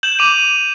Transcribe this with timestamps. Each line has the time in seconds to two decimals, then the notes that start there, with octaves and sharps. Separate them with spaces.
0.03 G6 E7 F#7
0.19 D6 D#7 F7